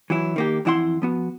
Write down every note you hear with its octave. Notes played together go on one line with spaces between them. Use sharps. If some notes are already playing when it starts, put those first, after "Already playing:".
E3 F#3 E4
D#3 A#3 G4
F2 E3 E4 F#5 C6
F3 B3 F#4